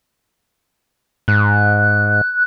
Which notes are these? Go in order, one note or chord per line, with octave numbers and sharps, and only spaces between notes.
G#2 F#6